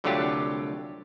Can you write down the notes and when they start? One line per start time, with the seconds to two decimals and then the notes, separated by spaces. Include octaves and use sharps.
0.04 C2 D3 F#3 A3 F4 G4